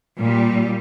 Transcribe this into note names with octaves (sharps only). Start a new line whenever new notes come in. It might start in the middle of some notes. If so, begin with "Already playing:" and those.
A#2 G3